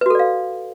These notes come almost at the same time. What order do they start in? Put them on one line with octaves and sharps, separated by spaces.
B4 F#4 A4 D5 F5